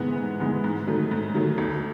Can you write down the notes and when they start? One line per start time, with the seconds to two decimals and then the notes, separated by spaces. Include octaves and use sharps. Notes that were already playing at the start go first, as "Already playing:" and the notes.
Already playing: G#2 E3 G#3 B3
0.17 G#2
0.40 E3 G#3 B3
0.64 G#2
0.87 D#3 F#3 A3
1.11 G#2
1.34 D#3 F#3 A3
1.58 D2